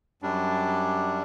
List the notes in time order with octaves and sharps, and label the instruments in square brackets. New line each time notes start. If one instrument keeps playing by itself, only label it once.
[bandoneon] F#2 G3 D4